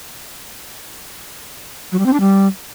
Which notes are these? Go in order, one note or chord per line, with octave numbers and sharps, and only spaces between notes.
F#3
G3
C4
D4
G3